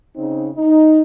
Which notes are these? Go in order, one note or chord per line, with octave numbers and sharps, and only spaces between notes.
C#3 C4 D#4
D#4